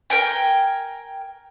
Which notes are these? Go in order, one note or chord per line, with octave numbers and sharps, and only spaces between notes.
A#4 G5 G#5